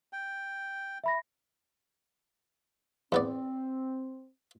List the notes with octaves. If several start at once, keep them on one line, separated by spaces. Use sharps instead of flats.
G5
E5 B5 A#6
E2 B3 C4 D5